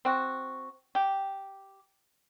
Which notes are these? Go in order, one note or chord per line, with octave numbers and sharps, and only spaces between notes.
C4 F#4
G4